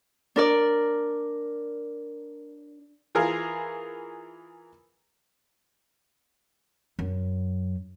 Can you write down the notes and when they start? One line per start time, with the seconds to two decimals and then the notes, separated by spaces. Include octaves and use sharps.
0.36 D4 A#4 D5
3.15 E3 F4 G#4 A#4
6.99 F#2